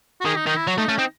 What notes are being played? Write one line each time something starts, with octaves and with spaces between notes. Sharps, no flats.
F#4
D#3 G#4
D#4
D#3 D#4
E4
F#3 F#4
A3 D#4
A3 C#4
C4 D#4